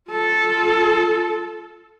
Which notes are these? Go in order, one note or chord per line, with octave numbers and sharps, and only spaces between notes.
F4 A4